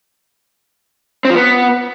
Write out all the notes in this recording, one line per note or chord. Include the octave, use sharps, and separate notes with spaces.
C4
F3
B3